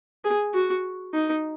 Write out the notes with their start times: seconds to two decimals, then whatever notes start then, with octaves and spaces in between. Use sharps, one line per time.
0.24 G#4
0.54 F#4
1.13 D#4